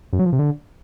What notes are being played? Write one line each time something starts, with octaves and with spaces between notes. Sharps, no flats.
F#2
F#3
F3
C3
D3